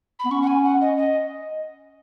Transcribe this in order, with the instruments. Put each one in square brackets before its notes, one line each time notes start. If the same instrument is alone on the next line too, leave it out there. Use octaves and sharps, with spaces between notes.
[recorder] B5
[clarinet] B3
[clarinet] C#4 [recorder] C#6
[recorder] F#5
G#5
F#5
D#5
D#5